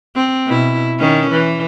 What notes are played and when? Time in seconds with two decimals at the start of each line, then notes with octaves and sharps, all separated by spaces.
0.15 C4
0.47 B2 E4
0.99 D#3 C#4
1.31 E3